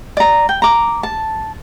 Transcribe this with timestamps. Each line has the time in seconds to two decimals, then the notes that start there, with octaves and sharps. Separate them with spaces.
0.17 D5 A#5
0.49 G5
0.62 A#5 D6
1.03 A5